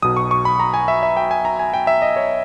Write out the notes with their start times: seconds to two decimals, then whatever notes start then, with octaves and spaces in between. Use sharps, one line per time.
0.02 B1 B2 D#6
0.17 C#6
0.31 C#6
0.45 B5
0.60 A#5
0.74 G#5
0.88 E5
1.03 E5
1.17 G5
1.31 G#5
1.45 A#5
1.59 G#5
1.74 G5
1.87 E5
2.02 D#5
2.16 C#5